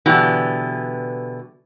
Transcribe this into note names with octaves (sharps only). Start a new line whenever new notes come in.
B2 D3 E3 G3